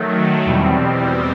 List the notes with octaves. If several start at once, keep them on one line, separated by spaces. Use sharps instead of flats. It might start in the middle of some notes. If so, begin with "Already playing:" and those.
Already playing: D#3 F#3 A3
E2 B2 G3 C4